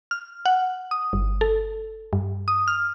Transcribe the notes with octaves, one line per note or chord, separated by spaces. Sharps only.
F6
F#5
D#6
G1
A4
G2
D#6
F6